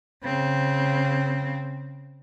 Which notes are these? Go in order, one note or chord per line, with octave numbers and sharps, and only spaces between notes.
C#3 C4